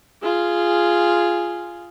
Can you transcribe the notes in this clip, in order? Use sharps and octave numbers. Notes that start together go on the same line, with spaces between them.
F4 G#4